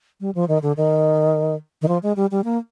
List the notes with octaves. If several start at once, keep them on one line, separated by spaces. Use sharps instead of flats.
G3
F3
D#3
D3
D#3
D#3
F3
G#3
G3
G3
A#3